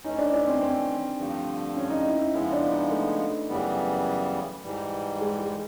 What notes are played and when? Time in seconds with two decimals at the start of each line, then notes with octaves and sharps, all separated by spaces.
0.04 E3 A3 C#4 D#4
0.18 D4
0.33 D4
0.47 C4
0.61 C4
1.19 G2 D3 F3 A3
1.77 C#4
1.90 D#4
2.05 E4
2.19 E4
2.33 C#3 F3 G#3 B3 E4
2.53 D4
2.72 D#4
2.91 A3
3.48 F#2 C#3 E3 G3 B3
4.64 G#2 E3 G3
5.21 G#3
5.40 G#3